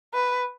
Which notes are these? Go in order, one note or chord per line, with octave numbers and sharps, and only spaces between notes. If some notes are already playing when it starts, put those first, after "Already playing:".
B4